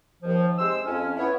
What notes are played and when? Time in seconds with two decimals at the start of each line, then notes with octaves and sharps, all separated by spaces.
0.23 D#2 F3
0.58 C3 G#3 C5 E6
0.84 F2 C#4
1.17 B3 E4 C#5